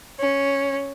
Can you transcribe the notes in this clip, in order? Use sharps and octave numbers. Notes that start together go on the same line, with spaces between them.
C#4